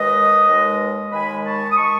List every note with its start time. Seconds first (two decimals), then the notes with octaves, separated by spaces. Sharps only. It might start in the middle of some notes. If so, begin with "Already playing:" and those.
Already playing: D#2 D#3 G#3 B4 D#5
0.48 D#2 D#3 G#3
1.12 D#2 D#3 G#3 G#5 B5
1.45 A5 C#6
1.71 D#6
1.77 D#3 G#3 A5 C#6